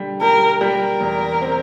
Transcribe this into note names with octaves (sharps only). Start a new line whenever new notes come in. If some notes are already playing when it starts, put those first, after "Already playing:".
Already playing: D3 G3
G3 A#4
G3 A#4
E2
C4